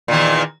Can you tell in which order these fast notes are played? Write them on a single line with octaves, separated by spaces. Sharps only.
A#2 D#3 E2